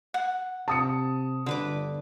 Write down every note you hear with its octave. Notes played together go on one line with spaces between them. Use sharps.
F#5
C3 A5 D#6 C#7
G1 D3 B4 D6